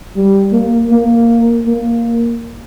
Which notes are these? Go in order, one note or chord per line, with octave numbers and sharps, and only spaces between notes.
G3
A#3
A#3
A#3